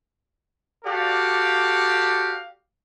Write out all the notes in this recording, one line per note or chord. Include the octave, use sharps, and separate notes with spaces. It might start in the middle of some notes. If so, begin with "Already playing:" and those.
F#4 G4 A4 D5 F5